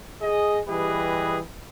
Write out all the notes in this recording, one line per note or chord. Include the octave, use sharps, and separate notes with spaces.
G#4 D#5
E3 G3 G4 G#4 B4 D#5